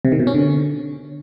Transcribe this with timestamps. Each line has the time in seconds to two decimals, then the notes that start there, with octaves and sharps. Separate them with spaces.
0.05 C3
0.12 D#3
0.20 B2
0.27 C#4
0.34 D3